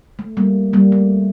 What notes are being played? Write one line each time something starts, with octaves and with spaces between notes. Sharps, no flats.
A3
G3 A#3
G3 A#3
A3